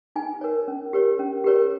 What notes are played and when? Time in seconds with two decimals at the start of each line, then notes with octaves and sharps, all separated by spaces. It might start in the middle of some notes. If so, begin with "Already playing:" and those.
0.16 D#4 G#5
0.41 A#4 C#5
0.68 C#4
0.93 G4 A#4 C#5
1.19 C#4
1.44 G4 A#4 C#5